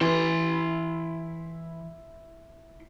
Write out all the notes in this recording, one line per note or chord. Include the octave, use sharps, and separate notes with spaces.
E3 E4 C6